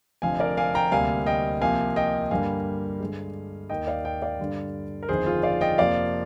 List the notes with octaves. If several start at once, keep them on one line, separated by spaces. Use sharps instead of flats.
F1 F2 D3 F3 F5 G#5
A#4 D5
F5 G#5
G5 A#5
D2 C3 G3 A#3 F5 G#5
D#5 G5
C2 C3 F3 A#3 F5 G#5
D#5 G5
G2 D3 G3 A#3 F5 G#5
G2 D3 G#3
D#2 D#3 A#3 D#5 G5
D5 F5
D#5 G5
D5 F5
G2 D3 G3
A#4
G1 F2 D#3 G#4 C5
F4 G#4
D5 F5
D#5 G5
F2 C3 F3 A#3 D5 F5